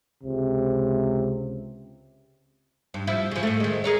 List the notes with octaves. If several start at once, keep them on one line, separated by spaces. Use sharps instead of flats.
C#2 C3
G2
F3 E4
C#3 F3
A2 A3
D#3 G#3
G#4 A#4 C#5